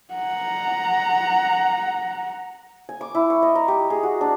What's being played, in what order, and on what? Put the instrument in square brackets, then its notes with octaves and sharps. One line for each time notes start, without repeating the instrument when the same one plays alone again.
[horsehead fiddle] F#5 A#5
[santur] G#5
D6
E4
C#6
D#5
A#5
G4
G#4
F#4
D4